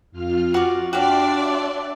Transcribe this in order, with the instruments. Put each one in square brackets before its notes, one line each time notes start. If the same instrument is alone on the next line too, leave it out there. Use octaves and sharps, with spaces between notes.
[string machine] F2 F4 F6
[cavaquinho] F#4 D5
[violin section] D4 D5 [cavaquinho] F#4 G4 F5 [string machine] E5 C6 F#6